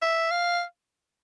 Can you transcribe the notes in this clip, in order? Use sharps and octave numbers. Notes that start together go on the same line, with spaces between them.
E5
F5